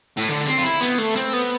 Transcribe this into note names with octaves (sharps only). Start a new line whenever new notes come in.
A2
D3
C4
F4
E4
B3
A3
C4
B3